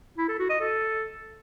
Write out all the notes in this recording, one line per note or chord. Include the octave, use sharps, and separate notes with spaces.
E4
A4
F#4
D#5
A4